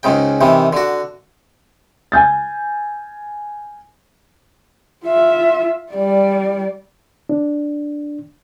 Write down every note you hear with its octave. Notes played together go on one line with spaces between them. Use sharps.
C#2 G#2 C#3 G5
C3 D#3 E3
D3 F#4
G#5 G6 A6
F4 E5
G3 D5
D4